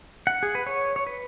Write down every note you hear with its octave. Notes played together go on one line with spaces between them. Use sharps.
F#5
G#4
B4
C#5
C#5
B4